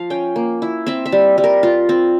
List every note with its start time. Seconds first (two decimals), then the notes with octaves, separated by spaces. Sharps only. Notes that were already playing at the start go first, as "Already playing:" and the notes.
Already playing: F3 F5
0.10 C#4 G5
0.36 A#3
0.62 E4
0.86 C4 E5
1.06 E5
1.12 G3
1.38 G3
1.44 A#4
1.63 F4
1.89 C4